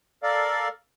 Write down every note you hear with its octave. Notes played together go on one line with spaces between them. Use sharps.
A4 A#4 D5 F5